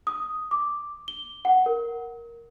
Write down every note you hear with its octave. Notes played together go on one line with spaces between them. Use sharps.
D#6
D6
G7
F#5
A#4